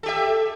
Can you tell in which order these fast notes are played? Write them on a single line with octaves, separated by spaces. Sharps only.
A4 G4 E5